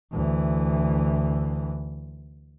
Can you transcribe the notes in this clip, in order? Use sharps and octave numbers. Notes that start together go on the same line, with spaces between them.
D2 E3